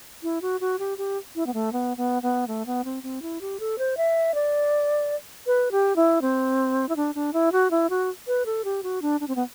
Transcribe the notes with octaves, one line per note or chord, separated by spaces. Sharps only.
E4
F#4
F#4
G4
G4
E4
B3
A3
B3
B3
B3
A3
B3
C4
C4
E4
G4
A4
C5
E5
D5
B4
G4
E4
C4
E4
D4
D4
E4
F#4
E4
F#4
B4
A4
G4
F#4
D4
D4
C4
B3